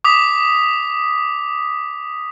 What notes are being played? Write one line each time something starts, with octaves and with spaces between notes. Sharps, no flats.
D6 D#6 B6